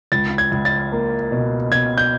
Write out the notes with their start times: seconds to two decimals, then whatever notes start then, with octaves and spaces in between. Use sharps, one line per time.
0.12 C#2 A6
0.38 G#6
0.51 C#2
0.65 A6
0.92 A#3
1.32 B2
1.71 B2 G#6
1.98 G6